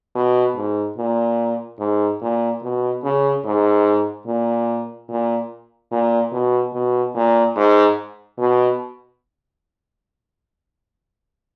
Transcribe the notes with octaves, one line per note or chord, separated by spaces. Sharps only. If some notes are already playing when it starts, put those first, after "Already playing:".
B2
G#2
A#2
G#2
A#2
B2
C#3
G#2
A#2
A#2
A#2
B2
B2
A#2
G#2
B2